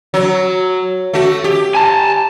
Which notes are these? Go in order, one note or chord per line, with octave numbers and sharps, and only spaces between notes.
F#3
A3 F#4
G4
G#5 A5